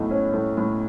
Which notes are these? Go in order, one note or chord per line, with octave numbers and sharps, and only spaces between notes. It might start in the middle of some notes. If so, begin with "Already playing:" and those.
Already playing: B1 A2
C#4
A2
A2